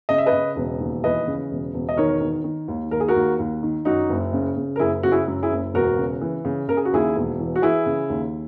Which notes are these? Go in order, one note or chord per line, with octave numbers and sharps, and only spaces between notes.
C#3 D#5
E5
B4 D#5
C#3
E1
D#2
E3 B4 D#5
C#3
E1
E1
D#5
D#3 A#4 C#5
D#3
D#3
D#2
D#2 A#4
G#4
F#4 A#4
D#2
D#2
D#3
F#2 D#4 F#4
F#1
C#3
C#3
A#4
F#1 E4 G#4
C#3 F#4
E4 G#4
F#2
E4 G#4
F#1
E1 F#4 A#4
C#3
E3
C#3
C#3 A#4
G#4
F#4
D#2 E4 G#4
E1
E3
F#4
E3 E4 G#4
C#3
D#2